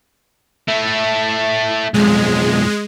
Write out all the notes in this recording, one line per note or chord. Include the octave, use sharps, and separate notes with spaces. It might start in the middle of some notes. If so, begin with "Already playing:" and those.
A3 E4
B1 F2 G#3